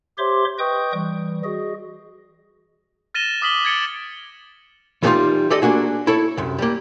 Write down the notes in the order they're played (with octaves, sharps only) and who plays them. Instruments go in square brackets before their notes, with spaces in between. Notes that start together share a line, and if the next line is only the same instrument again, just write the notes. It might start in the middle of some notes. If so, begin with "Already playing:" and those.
[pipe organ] G4 C5 C#5 E5 C6 D6
B4 D#5 G5 C#6 D#6 G6
E3 G3
F#4 G#4 D#5
[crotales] F6 A6 A#6 D#7 E7 G7
D6 D#6 F6 B6 F#7 G7
F6 G#6 A6 C#7 D7 G7
[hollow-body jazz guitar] E3 G3 A3 C#4 D#4 F4
G4 A4 D5 D#5
A#3 D4 F#4 G#4
E4 A4 C#5
C2 F#2
G3 A#3